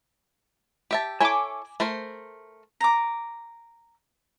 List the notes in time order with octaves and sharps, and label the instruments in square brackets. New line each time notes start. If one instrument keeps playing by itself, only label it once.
[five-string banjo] G4 E5 A5
[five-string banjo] E4 A4 C#5 [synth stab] G#5 D6
[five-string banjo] A3 A#4 C5
[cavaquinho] A#5 D6